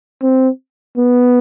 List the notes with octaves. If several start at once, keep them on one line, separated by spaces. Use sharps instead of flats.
C4
B3